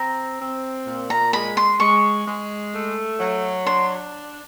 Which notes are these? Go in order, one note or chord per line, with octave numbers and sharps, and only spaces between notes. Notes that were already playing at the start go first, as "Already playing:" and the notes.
Already playing: C4 A#5
C4
A#2
A#5
G#3 B5
C6
G#3 C#6
G#3
A3
F#3
D4 C6